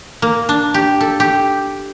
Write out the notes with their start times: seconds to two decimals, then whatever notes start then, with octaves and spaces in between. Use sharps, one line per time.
0.22 A#3
0.49 D4
0.74 G4
1.01 A4
1.20 G4